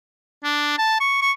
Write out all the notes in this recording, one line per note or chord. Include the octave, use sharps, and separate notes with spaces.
D4
A5
C#6
C#6